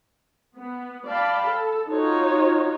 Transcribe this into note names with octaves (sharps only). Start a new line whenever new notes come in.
B3
D5 F5 G5 A5 B5
A4
D#4 F4 F#4 C#5